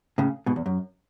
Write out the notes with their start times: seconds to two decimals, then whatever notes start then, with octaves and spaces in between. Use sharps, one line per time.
0.18 A2 C#3
0.46 G#2 B2
0.56 E2
0.66 F#2